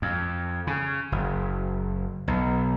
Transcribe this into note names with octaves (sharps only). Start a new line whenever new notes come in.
F2
C#3
F#1
B1